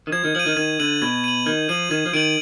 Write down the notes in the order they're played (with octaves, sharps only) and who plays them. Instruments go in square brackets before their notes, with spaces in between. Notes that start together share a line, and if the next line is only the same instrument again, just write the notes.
[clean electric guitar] D#3
[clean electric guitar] F3 [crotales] G#6
[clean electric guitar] D#3
[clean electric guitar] F3 [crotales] D#7 F#7
[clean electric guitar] D#3
[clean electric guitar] D#3 [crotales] G#6
[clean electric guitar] D3 [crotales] D#7 F#7
[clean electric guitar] B2 [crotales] G#6
[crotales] D#7 F#7
[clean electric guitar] D#3 [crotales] G#6
[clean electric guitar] F3 [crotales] D#7 F#7
[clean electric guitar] D#3 [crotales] G#6
[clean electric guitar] F3
[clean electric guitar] D#3 [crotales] D7 F#7